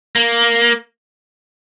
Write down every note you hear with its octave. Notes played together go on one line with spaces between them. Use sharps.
A#3